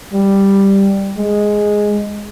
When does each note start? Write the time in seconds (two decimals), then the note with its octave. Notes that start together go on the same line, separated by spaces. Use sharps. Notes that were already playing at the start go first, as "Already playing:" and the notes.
0.13 G3
1.17 G#3